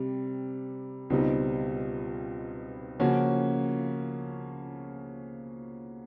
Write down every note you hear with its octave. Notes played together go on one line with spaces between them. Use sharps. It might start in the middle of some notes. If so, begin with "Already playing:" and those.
Already playing: C3 G3
C#2 B2 G3 C4 D#4
C#3 F3 A#3 C#4 F#4